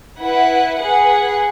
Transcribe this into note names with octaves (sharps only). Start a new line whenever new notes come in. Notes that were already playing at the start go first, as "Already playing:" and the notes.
E4 B4 F#5
G#4 B4 F#5